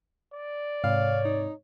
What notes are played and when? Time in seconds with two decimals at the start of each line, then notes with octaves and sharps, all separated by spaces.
0.34 D5
0.84 G#2 C3 C#5 F5
1.25 D#4